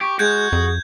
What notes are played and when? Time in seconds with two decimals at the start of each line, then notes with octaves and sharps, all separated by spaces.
0.01 G4 C#6
0.19 G#3 F#4 G6 G#6
0.52 F2 G#4